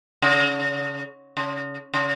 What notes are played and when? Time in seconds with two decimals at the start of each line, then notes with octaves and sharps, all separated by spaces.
0.22 C#3
1.37 C#3
1.94 C#3